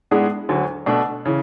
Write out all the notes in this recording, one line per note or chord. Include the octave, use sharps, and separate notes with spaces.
A2 G#3 B3 D4 G#4
D2 D3 F#3
B2 A3 D4
C#3 E3